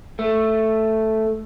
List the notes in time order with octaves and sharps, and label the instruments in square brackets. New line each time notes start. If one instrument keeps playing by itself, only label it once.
[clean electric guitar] A3